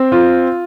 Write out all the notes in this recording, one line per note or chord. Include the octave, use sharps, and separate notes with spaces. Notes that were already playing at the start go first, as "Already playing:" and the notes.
Already playing: C4
F4